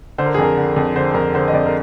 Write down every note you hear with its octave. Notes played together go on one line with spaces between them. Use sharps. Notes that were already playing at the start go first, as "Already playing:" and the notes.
D3 C5
A#4
G#4
F2 A#4
D3
F2
D3 C5
F2 A#4
D3 C5
D#5
F2 D5
A#4